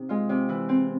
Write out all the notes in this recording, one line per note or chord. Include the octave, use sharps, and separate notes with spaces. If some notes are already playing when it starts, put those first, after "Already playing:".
Already playing: C3 D#4
G#3 F4
C3
E3 E4
C4